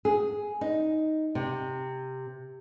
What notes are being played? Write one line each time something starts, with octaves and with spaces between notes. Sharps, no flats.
G#4
D#4
C3